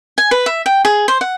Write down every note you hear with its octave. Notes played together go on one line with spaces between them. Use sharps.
G#5
B4
E5
G5
G#4
C5
F#5